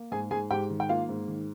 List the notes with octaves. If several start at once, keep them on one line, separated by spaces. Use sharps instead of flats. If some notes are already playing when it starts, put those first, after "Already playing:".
Already playing: A#3
G#2 G#4 G#5
G#2 G#4 G#5
G#2 G4 G5
D#3
G5
A#3 F4 F5
G#2
D#3